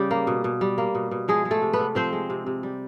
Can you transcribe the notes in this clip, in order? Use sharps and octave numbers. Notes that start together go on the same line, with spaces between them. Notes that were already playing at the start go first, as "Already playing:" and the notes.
Already playing: C#3 G3 G4
A#3
B2
B2
G3
A#3
B2
B2
F3 G#3 G#4
G#3
A3 A4
C3
B3 B4
C3
F3 C4 C5
G#3
C3
C3
G3